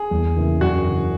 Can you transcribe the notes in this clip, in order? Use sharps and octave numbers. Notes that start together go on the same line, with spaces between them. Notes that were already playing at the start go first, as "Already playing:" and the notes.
Already playing: G#4
E2
C#3 E3 A#3
F#2 F#4
C#3 E3